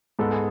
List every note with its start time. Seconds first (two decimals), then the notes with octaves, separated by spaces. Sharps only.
0.19 G#2 G#3 B3 A4
0.32 G#4